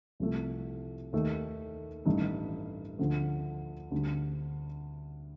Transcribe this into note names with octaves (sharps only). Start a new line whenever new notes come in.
C2 C3 F3 A3
D#2 D#3 A3
A1 G2 D#3 A3 D#4
D2 D3 F3 A3
D2 D3 G3 D4